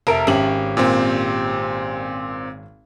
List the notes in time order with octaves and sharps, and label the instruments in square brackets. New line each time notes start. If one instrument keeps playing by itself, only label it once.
[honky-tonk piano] F1 A#4 D7 [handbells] E5 A5
[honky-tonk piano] G#1 C#4 F#7 [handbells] G4 G5
[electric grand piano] A#2 C4